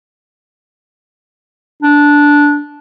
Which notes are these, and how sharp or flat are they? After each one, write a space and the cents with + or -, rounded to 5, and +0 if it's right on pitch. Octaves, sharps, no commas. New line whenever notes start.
D4 -5